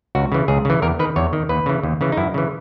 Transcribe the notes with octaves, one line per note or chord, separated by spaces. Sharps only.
C#2 F#4
C#3 E3
C#2 G#4
C#3 E3
E2 A#4
D#3 B4
E2 C#5
D#3
D#2 B4
C#3 E3
D#2
C#3 E3
D#4
F#2 E4
C#3 E3